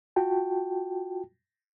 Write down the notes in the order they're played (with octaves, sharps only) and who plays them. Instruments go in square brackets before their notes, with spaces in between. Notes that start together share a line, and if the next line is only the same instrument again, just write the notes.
[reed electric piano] F4 F#4 G5 A5